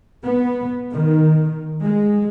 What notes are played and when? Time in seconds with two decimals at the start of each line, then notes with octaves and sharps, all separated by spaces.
0.23 B3
0.91 D#3
1.84 G#3